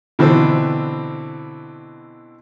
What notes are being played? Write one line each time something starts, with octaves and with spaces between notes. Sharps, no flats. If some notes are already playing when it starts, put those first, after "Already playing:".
B2 D3 E3 C4